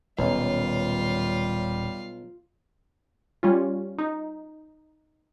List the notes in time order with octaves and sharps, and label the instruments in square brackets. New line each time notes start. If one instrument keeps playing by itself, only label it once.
[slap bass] D#1 C#4 [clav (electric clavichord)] B1 [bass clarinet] G3 [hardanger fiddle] F4 F5
[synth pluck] G3 C#4 F4
D#4